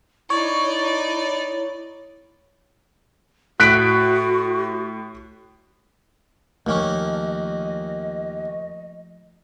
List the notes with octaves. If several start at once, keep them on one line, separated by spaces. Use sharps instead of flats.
D#4 E4 C#5 D5
A2 F#4 F#6 B6 D7
D#2 F3 A3 A#3 C#4 D#5